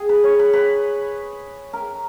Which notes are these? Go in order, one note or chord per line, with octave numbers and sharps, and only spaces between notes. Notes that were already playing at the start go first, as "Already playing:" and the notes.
Already playing: G#4
B4
C#5
B4
B4
A#4